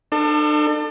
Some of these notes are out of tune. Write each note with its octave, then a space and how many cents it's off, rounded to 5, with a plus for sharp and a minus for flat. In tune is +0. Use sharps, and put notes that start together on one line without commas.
D4 +40 A4 +25